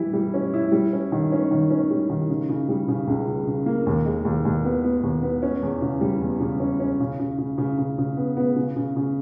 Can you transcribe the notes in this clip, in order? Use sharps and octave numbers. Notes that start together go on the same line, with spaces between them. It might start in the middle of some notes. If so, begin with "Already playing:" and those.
Already playing: E3 G3 E4
G3
C#4
E4
G3
C#4
D#3
C#4
D#3
C#4
G3
D#3
C#3
C#3
G3
C#3
C#2
C#3
C#3
A#3
D#2
G#3
D#2
D#2
B3
B3
D#2
B3
C#4
E2
C#3
G3
E2
C#3
C#4
C#4
C#3
C#3
C#3
C#3
C#3
C#3
B3
B3
C#3
C#3
C#3